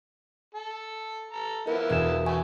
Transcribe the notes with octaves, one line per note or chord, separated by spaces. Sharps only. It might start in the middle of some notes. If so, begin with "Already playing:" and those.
A4
A4 A#5
F3 B3 E4 A#4
E1 G#4 E7
A3 B3 F#4 G#5